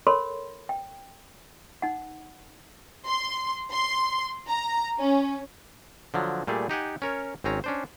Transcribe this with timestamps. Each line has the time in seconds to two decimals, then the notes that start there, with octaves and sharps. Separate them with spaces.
0.07 A4 A#4 C#5 B5 C6
0.69 G5
1.82 D#4 F#5
3.06 C6
3.71 C6
4.48 A#5
4.98 C#4
6.14 D3 F3 F#3
6.47 A#2 G3 A3 G#4
6.69 D#4 G4 F#5 G#5
7.02 C#4 A#4 C#5
7.44 G#1 C4 C#4 A#5
7.64 C#4 D4 C5